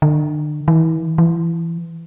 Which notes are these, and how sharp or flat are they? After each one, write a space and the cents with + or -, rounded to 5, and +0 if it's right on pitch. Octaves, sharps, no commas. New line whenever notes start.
D3 +40
E3 -35
E3 +20